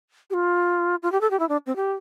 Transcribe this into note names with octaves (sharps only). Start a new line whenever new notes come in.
G4
F4
F4
G4
A4
G4
E4
D4
C4
G4